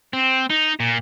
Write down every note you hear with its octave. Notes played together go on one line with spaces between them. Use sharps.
C4
D#4
A#2